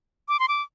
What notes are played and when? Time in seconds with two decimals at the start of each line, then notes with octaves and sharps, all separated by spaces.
0.29 D6
0.40 C6
0.48 D6